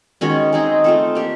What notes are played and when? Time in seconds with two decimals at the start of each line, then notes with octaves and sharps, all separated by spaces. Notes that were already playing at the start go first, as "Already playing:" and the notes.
0.21 D#3 G#3 C#4 F#4
0.53 G#3 C4 D#4 G#4
0.84 A3 C4 F4 A4
1.15 A#3 D4 G4